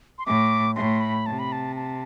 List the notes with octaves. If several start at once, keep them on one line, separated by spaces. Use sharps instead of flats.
C6
A2 D6
A2 C6
B5
C3 A5
B5
A5
A5